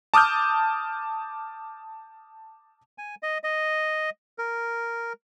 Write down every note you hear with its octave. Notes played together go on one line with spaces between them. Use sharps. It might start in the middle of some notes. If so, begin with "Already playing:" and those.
A5 D6 D#6 F6 G6
G#5
D#5
D#5
A#4